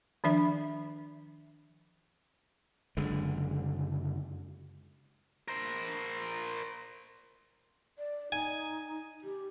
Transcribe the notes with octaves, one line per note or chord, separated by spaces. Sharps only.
D#3 F3 D4 E5 B5
F#1 D3 G#3
A#4 C5
D5
D#4 G#5
G4